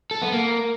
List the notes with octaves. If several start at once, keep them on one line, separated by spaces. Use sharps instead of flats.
A4
B3
A#3